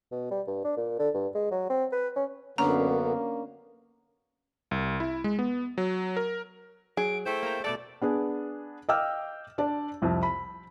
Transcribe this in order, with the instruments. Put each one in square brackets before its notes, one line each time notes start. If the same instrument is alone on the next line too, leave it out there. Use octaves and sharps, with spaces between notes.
[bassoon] B2
G3
G2
D4
A#2
D3
G2
G#3
F#3
C4
B4
C#4
[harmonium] F#2 D3 B3 [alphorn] A#3 [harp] C#4 D4 [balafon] A#5
[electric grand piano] C2
E4
G#3
B3
F#3
A#4
[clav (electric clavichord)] F#3 [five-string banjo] G#4 [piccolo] D7
[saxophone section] A3 E4 C5 [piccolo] G5
[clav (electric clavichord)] A#3 A4 A#5
[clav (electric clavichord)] B2 A3 A4 [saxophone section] D5 [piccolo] D6
[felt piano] B3 D4 G#4
D#5 F5 G5 D6 E6 F6
D4 D5 A5
C2 F2
B5